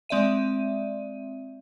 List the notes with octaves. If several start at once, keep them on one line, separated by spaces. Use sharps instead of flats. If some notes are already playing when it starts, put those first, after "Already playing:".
G#3 C4 D5 E5 D#7